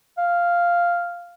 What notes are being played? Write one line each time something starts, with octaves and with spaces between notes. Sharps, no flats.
F5